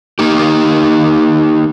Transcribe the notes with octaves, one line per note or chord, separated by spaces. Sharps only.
A#3 D#4 G4